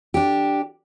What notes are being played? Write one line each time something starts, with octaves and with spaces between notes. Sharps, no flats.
D4 G4